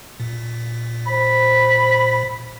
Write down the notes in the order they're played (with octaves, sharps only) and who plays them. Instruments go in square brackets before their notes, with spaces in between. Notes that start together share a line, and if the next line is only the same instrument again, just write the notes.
[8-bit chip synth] A#2
[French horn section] C5 [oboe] B5